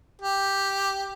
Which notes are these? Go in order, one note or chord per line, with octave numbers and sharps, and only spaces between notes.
G4